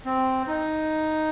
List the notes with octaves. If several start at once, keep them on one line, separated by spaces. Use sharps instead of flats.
C4
D#4